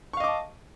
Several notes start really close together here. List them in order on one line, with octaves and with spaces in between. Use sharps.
C#6 F5 D#5 D6 A5